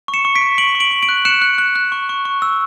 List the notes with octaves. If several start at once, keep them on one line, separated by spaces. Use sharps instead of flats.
C#6
C#7 E7
C#6
B6 D7
C#6
C#6 D7 F#7
C#6
D7 F#7
C#6
D7 F#7
F#6
F#6 C#7 E7
F#6
F#6
F#6
C#6
C#6
C#6
E6